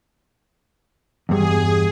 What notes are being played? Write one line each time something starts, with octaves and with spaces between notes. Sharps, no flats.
E2 G2 G#4